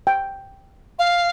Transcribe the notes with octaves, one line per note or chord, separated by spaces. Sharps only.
G5
F5